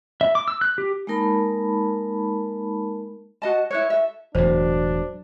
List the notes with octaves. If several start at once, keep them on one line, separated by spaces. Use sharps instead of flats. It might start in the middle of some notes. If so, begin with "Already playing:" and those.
E5
D6
E6
F#6
G4
G#3 A#3 D#4 A#4 A5 B5
F#4 D#5 A5
E4 B4 C#5
A4 E5
E1 E2 A2 F#3 D4 C5